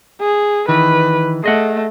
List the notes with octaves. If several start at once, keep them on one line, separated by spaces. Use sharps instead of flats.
G#4
D#3 E3 B4
A3 G#4 D#5 F#5